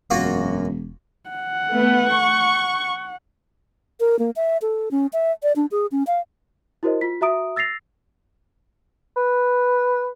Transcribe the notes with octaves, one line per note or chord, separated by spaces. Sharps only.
E1 F#2 A#3 F4 F#4
F#5
A3 B3
C#6
A#4
A#3
E5
A4
C#4
E5
D5
D4
G#4
C#4
F5
E4 F#4 A#4 C5 D#5
F4 B6
F#4 E5 A#5 D#6 D7
E6 A6 A#6 C7 F7
B4